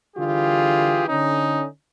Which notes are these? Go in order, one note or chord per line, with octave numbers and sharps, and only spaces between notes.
D3 E3 G3 F4 G4 G#4
D3 C#4 D#4